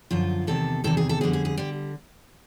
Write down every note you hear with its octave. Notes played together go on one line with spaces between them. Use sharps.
F#2 D3 F3 F4
E2 C3 D#3 A4
E2 C3 D#3 A4
G#4
A4
F2 D3 G3 G#4
G#4
G#4
D3 G3 G4